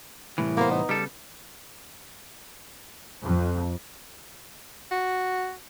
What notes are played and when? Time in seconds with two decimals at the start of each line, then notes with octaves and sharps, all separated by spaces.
0.38 C2 A2 E3
0.57 A#3 B3 B4 C5
0.71 D#4
0.89 C#3 G3 A4
3.24 F2
4.91 F#4